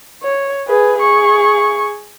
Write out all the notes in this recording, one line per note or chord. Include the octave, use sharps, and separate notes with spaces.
C#5
G#4 B4
G#4 C#6